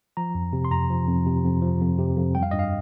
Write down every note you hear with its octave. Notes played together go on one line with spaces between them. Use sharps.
F3 A#5
F2
C3
C6
F2 A#5
F3
F2
C3
F2
F3
F2
C3
F2
G3 G5
F5
G2 D#5
F5